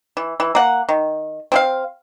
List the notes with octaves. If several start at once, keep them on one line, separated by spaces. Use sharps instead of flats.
E3
E3
A#3 F#5
D#3
C4 G4 F5